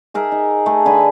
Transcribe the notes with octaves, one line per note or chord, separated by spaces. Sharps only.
D#4 G#4 A#4 E5
D#4
A3 G#4
D3 B4 G#5